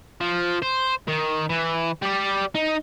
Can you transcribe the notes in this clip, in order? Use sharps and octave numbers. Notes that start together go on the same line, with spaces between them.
F3
C5
D#3
E3
G3 D5
D#4